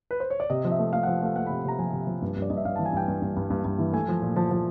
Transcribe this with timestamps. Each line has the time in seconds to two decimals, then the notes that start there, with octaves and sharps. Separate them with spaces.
0.11 B4
0.20 C5
0.30 C#5
0.40 D5
0.50 C3 D#5
0.65 F3
0.71 E5
0.79 A3
0.93 A3 F5
1.03 F3 F#5
1.22 A3 F5
1.36 A3 F#5
1.46 C3 B5
1.65 C3 A#5
1.79 F3 G#5
1.93 C3
2.07 F3
2.22 G2
2.36 G2
2.42 D5
2.50 G2 D#5
2.57 E5
2.65 G2 F5
2.76 E3 A5
2.86 G#5
2.93 G2 G5
3.08 G2
3.22 G2
3.37 G2
3.50 G2
3.65 G2
3.79 E3
3.93 A3 G#5
4.08 F3
4.22 A#2
4.36 F3 A5
4.51 F3